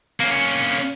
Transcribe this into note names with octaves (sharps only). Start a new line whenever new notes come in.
A#3 C#4